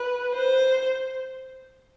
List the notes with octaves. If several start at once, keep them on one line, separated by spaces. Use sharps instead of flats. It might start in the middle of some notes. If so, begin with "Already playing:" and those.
Already playing: B4
C5